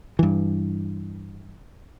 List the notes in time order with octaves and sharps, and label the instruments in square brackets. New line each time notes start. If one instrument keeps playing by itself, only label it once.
[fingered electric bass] G2 E3